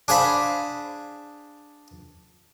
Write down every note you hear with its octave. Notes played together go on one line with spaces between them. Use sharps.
D4 G#4 C5 F5 B5